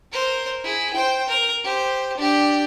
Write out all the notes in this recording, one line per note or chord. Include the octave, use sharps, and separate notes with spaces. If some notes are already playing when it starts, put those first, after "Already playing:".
A#4 C5
E4 G#4
C5 G5
A#4
G4 C5
D4 G4